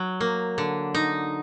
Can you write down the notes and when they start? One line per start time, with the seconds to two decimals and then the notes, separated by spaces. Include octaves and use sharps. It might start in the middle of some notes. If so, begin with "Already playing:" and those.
Already playing: F#3
0.20 A#3
0.58 D3
0.94 D#4